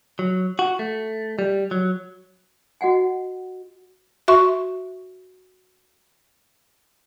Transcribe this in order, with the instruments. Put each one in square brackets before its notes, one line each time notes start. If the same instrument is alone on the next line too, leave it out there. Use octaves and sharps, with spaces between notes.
[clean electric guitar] F#3
F#4
A3
G3
F#3
[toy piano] F#4 D#5 F#5 G#5
[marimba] F#4 E5 C6 C#6